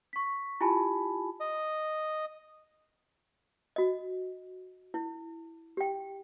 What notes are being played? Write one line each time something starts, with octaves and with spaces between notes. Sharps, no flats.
C#6 B6
E4 F4 G4 G#5 A5 B5
D#5
F#4 D#5
E4
G4 G5